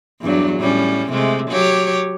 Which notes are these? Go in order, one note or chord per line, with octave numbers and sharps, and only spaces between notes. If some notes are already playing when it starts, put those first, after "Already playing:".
E2 G2 F#3
A2 G3 C#4
C3 G#3 A3
F#3 G4 C#5